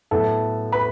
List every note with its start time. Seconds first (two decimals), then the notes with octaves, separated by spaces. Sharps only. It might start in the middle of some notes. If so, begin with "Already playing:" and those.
0.11 A2 F#3 B3 A4 A5
0.72 B4 B5